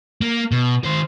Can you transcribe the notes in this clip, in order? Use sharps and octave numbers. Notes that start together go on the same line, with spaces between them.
A#3
B2
D#3 C5